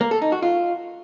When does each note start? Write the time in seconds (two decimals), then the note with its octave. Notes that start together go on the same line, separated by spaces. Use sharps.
0.01 A#3
0.11 A4
0.22 D#4
0.32 F#4
0.42 F4